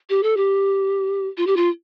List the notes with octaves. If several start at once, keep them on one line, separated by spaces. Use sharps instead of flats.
G4
A4
G4
F4
G4
F4